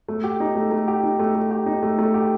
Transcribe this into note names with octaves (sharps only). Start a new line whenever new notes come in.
A3
G4
D#4
A3
A3
G4
D#4
A3
A3
G4
D#4
A3
A3
G4